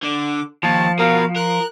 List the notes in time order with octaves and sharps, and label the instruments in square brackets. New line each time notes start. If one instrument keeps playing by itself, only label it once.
[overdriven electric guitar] D3 [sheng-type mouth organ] D6
[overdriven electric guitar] D#2 [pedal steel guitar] F3 [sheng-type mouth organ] A5
[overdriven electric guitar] B2 [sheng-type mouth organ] A#4 F5
[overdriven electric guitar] A#4 [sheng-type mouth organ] F#6